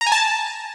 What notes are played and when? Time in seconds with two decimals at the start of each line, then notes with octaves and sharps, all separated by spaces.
0.01 A#5
0.06 G#5
0.12 A5